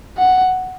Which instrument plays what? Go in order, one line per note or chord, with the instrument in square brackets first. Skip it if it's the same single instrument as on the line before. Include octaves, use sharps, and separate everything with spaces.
[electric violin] F#5